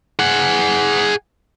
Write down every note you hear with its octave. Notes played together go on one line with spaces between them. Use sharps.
G#4 F#5